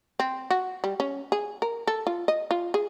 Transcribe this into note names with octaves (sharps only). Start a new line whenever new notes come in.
C4
F#4
G3
C#4
G#4
A#4
A4
F4
D#5
F4
G#4